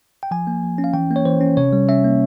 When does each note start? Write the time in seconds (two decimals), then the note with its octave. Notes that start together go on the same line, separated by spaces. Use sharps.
0.23 G5
0.31 F3 G#5
0.47 A#3
0.63 F3
0.78 C#4
0.84 F5
0.94 E3 G5
1.11 A#3
1.16 C#5
1.25 E3 C5
1.41 C#4
1.57 C3 C#5
1.73 G3
1.89 C#4 E5
2.04 A#3